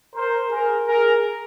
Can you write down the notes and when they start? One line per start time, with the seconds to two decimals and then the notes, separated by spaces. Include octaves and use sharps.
0.15 A#4 C5
0.51 G#4 A#4
0.87 G#4 A#4